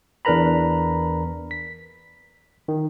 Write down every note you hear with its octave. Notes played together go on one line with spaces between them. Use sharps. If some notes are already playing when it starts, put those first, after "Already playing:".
E2 D4 A#4 B4 A#5 B5
B6
D#3